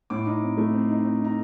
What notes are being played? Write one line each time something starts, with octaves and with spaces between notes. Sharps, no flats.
A2 D6
D#4
C4
A3
C4
D#4
C4
D#4 A#5